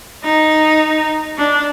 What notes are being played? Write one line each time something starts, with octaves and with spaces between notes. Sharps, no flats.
D#4
D4